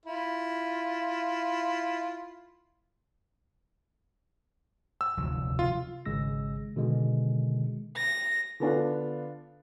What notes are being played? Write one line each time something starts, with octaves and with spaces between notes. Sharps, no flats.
E4 F4
E6
F1 D2 F#3
F4
G#1 C#3 G#3 E6 A#6
B2 D3 D#3 G#3
A#6
D3 B3 D4 F4